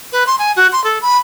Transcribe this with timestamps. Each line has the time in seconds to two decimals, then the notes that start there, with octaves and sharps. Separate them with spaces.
0.12 B4
0.27 C6
0.39 G#5
0.56 F#4
0.72 C6
0.84 A4
1.02 B5